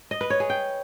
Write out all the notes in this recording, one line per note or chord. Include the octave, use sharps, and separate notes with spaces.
D#5
B4
C#5
G#4
G5